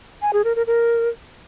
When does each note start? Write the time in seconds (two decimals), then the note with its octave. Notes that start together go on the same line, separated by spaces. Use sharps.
0.22 G#5
0.33 G#4
0.44 A#4
0.56 A#4
0.67 A#4